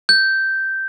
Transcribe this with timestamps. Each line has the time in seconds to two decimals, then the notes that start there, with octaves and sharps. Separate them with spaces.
0.09 G6